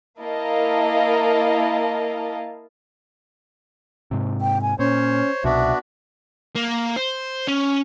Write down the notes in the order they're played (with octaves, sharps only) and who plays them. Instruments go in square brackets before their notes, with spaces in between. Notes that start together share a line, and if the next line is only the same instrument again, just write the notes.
[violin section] A#3 E4 A#4 D#5 F5 A5
[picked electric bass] G#2 C3
[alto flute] G5
G#5
[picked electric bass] A#2 [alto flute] C#4 [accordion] C5 C#5
[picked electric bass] C2 B2 [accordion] B3 D4 F#4 [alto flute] E5
[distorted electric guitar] A#3
C5
C#4